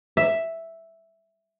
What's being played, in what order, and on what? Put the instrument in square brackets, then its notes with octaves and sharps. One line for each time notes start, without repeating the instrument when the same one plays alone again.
[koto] E5